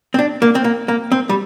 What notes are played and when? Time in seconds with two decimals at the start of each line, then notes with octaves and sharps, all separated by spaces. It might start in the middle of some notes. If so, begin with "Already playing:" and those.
0.14 C4
0.19 D4
0.42 A#3
0.55 C4
0.64 A#3
0.88 A#3
1.12 C4
1.29 G3